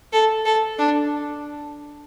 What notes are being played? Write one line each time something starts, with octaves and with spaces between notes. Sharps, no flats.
A4
A4
D4